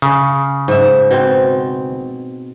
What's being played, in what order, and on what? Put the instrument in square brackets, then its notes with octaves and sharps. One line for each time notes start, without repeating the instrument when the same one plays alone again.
[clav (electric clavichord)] C#3
[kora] G#2 E5
B2 C4